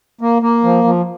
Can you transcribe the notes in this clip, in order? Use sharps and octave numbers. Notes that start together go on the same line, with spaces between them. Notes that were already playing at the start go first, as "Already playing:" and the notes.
A#3
A#3
F3
F3